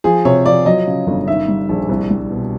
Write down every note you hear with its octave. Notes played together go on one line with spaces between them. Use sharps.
F3 G#4
C3 C#5
F3 D5
F#3 D#5
C#3
G1
D#3 E5
G3
A#1
C2
G3
B2